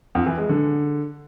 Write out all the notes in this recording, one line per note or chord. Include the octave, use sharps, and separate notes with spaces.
F2
E3
G#3
D3